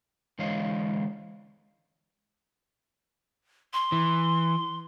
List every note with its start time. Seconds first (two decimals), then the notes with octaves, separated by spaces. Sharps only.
0.39 D3 E3 G#3 C#5 D#5 F5
3.73 C6
3.92 E3